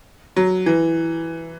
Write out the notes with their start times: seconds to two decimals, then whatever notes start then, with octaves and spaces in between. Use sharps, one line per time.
0.36 F#3
0.66 E3